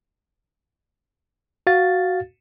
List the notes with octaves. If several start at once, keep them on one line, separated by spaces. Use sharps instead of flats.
F#4 F5 A6